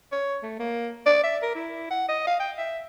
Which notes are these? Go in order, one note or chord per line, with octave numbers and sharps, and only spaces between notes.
C#5
A3
A#3
D5
E5
A#4
E4
F#5
D#5
F5
G5
E5